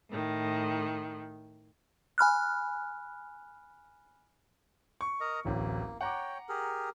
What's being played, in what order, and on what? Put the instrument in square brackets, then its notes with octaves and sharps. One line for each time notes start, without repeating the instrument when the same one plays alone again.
[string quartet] A2 D#3
[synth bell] G#5 B5 F6 F#6
[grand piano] C#6
[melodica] A#4 D#5 A#5
[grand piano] D1 A1 [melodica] A#3
[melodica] C#5 G5 [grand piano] F#5 A#5 D6
[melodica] G4 G#4 A#4